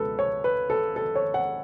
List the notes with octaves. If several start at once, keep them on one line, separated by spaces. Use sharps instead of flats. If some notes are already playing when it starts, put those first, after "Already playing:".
Already playing: C#2 B2 A4 B4
C#5
B4
A4
A4
C#5
F#5